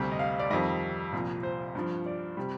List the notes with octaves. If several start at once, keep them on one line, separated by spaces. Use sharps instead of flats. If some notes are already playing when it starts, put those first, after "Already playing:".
Already playing: D2 C3 G3
D#5
F5
D5
F2 D#3 G3 D#5
C2 A#2 F3
C5
G2 F3
D5
C3 G3